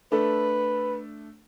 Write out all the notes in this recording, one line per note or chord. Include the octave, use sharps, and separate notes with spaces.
A3 D4 A4 B4